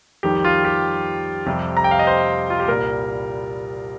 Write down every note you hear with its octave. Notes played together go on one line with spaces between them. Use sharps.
F2 D#3 G3 G4
F4
G4
F2 C3 G3
A#5
G5
F5
D#5
C5
F4
G4
C2 A#2 G3 A#4